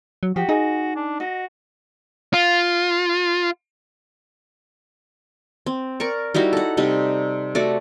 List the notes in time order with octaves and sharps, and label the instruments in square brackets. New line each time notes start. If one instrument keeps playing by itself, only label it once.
[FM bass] F#3
[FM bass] F3 [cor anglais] F#4 [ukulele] G4
[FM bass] D#4 [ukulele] G#4 D#5
[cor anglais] D4
[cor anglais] F#4 [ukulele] D#5
[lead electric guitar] F4
[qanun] C4
A#4 D5 C#6
G3 D#4 E4 F#4
A4 F#5
C3 G3 D#4
A3 F#4 D5 F#5